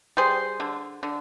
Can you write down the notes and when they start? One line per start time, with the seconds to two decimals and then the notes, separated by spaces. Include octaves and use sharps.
0.17 G3 G#4 C5
0.60 D3
1.03 D3